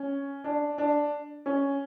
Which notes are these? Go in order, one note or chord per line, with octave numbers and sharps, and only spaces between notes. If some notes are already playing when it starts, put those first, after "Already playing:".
Already playing: C#4
D4
D4
C#4